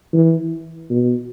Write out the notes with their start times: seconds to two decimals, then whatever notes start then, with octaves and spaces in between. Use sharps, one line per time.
0.13 E3
0.90 B2